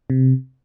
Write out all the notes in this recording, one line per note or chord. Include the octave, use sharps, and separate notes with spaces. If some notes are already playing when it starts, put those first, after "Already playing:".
C3